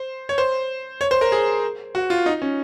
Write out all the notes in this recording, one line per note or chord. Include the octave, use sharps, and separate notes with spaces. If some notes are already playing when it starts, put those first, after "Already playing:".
Already playing: C5
C#5
C5
C#5
C5
A#4
G#4
F#4
F4
D#4
C#4